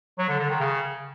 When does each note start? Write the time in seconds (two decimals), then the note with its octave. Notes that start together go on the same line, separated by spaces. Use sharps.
0.18 F#3
0.29 D3
0.39 D3
0.49 D#3
0.60 C#3